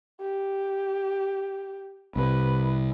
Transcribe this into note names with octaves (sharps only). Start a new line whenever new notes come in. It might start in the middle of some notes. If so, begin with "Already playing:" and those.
G4
C2 C3 B4